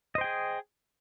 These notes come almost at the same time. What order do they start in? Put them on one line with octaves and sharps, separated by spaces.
D#5 C5 G5 G#4